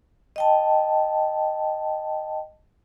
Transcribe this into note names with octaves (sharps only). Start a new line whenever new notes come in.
D#5 G5 A5